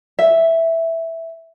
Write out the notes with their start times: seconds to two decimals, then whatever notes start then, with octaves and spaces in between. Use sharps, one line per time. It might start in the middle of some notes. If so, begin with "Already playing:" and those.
0.19 E5